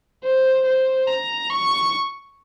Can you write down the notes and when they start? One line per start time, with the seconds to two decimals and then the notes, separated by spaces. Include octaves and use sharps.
0.25 C5
0.66 C5
1.07 A#5
1.50 C#6